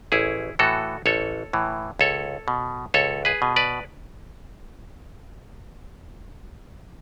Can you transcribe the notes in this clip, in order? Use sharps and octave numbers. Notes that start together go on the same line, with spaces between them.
A1 E4 G#4
A2 E3 F#4 A4
A1 A4 C#5
A2 E3
C#2 A4 C#5
B2
C#2 A4 C#5
G#4 B4
B2
B4 D5